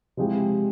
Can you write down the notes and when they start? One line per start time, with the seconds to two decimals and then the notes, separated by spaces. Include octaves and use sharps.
0.17 C3 F3 G#3 E4 G4